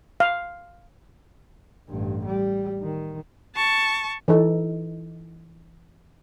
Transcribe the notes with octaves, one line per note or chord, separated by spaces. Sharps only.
F5
A1 G2
G3
D#3
A5 C#6
E3 D#4 A4